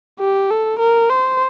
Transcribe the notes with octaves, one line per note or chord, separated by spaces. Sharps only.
G4
A4
A#4
C5